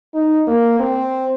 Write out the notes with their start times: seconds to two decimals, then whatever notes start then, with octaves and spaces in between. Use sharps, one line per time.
0.14 D#4
0.47 A#3
0.79 C4